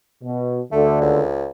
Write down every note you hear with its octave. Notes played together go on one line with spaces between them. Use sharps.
B2
D2 D3 A3
C#2